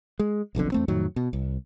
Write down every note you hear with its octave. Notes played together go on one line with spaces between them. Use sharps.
G#3
F1 B1 F2 D3
E2 A3 C4
F2 A2 D#3 F#3
B2
C2